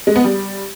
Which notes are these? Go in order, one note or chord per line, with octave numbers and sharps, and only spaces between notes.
G#3
B3
G3